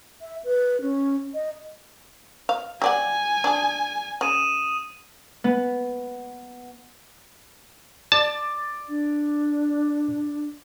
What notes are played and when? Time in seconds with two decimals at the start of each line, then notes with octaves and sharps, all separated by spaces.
0.21 E5
0.44 B4
0.82 C#4
1.34 D#5
2.49 F5
2.82 G4 D5 F#5 G#5
3.44 D4 G#4
4.21 C#3 D#6 D#7 E7
5.44 B3
8.12 D5 A5
8.89 D4